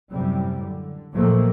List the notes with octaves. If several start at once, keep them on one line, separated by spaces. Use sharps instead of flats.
F#2 A2 C3 G3
D3
A#2 D#3 F3 F#3 A3 A#3